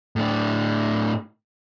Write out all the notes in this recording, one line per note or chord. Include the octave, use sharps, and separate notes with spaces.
A2 D4